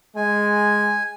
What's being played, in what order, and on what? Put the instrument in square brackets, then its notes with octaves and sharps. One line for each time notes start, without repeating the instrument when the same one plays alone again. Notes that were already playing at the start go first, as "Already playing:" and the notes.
[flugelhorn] G#3 [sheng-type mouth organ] G#5